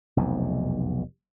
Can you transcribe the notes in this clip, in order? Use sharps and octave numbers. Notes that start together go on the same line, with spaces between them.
F1 B1 E2